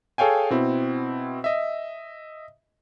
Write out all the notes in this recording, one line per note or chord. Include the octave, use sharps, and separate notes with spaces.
G#4 A4 C#5 F5 G5 G#5
B2 C4 E4
D#5 E5